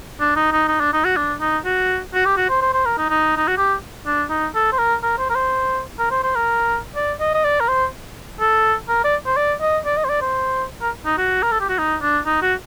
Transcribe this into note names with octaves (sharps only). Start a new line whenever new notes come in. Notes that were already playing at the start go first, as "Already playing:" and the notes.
D4
D#4
D#4
D#4
D4
D#4
F#4
D4
D#4
F#4
F#4
G4
F#4
C5
C5
C5
A#4
D#4
D#4
D#4
F#4
G4
D4
D#4
A4
C5
A#4
A#4
C5
A#4
C5
A#4
C5
C5
A#4
D5
D#5
D#5
D5
A#4
C5
A4
A#4
D5
C5
D5
D#5
D5
D#5
C5
D5
C5
A#4
D#4
F#4
A#4
A4
G4
F#4
D#4
D4
D#4
F#4